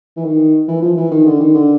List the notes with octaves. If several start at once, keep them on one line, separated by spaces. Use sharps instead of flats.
E3
D#3
E3
F3
E3
D#3
D3
D#3
D3